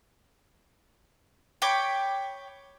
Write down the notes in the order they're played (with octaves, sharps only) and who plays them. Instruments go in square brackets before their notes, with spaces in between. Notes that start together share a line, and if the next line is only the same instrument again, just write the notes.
[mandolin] C#5 G5 B5 D6